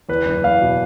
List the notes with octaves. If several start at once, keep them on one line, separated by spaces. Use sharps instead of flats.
E2 B4
F#1
E2 F5
B2